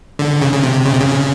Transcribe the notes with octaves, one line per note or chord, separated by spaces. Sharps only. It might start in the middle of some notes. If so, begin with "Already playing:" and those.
D3
C#3
C#3
C3
C#3
C3
C#3